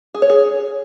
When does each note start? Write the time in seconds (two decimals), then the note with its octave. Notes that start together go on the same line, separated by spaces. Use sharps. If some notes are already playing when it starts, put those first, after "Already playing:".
0.14 G#4
0.22 C#5
0.30 G#4